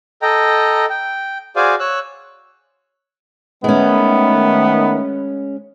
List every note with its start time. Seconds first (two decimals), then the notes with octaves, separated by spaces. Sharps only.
0.22 A4 D#5 G5 A#5
0.89 G5
1.56 F#4 G#4 C5 D5 F5 G#5
1.80 C#5 E6 F#6
3.64 D#3 G#3 A3 B3 C#4